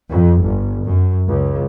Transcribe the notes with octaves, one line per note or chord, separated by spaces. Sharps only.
F2
G1
F#2
C#2